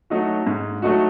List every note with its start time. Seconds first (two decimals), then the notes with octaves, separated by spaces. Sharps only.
0.10 F#3 A3 D#4 F#4
0.47 G#2
0.82 F#3 A3 D#4 F#4